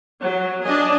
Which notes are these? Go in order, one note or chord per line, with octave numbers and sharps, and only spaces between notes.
F#3
D4 D#5 G#5